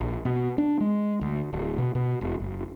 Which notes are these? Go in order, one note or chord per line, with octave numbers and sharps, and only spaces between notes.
A#1
B2
D4
G#3
D2
D1
B2
B2
E1
F#1